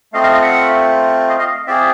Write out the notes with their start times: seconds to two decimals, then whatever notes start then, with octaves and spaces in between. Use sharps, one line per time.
0.13 A3 C4 F4 D#5 F5
0.23 D#5 F5
0.33 D#5 F5
0.42 E5 F#5
1.29 D#5 F5
1.39 D#5 F5
1.67 C4 F4 G#4 D5 E5